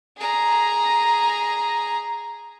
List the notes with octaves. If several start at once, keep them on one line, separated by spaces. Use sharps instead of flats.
G#4 A#5